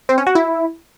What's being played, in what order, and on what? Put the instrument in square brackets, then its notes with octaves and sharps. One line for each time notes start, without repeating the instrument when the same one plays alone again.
[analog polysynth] C4
C#4
F#4
E4